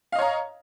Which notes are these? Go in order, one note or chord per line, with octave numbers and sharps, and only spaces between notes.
C#5 D#5 F5 A#5